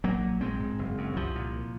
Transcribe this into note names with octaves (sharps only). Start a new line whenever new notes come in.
A#1 F#3 A#3
A#2
A#1 G#3 C4
G#2
F#1
F#2
C2 F3
A#2